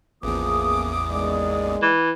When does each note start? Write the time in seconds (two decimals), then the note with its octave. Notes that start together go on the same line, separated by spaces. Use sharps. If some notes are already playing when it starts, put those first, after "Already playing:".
0.23 A1 E2 E3 F3 A#3 G#4 D6 D#6
1.11 D#2 G#3 D5
1.82 E3